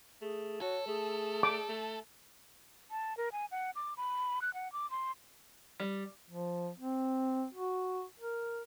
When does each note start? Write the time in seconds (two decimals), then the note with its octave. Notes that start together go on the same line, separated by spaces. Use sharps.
0.22 A3 G#4
0.61 F#4 A4 C#5
0.87 A3 G#4
1.43 D6
1.69 A3
2.91 A5
3.17 A#4
3.32 G#5
3.51 F#5
3.76 D6
3.97 B5
4.42 F#6
4.54 F#5
4.73 D6
4.91 C6
5.80 G3
6.30 F3
6.78 C4
7.54 F#4
8.20 A#4